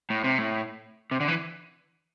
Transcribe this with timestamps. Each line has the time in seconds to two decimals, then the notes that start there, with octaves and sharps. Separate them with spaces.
0.10 A2
0.24 C3
0.38 A2
1.11 C3
1.20 D3
1.28 E3